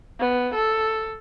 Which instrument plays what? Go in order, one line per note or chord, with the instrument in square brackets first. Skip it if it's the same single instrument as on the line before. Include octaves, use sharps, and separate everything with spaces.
[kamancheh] B3
A4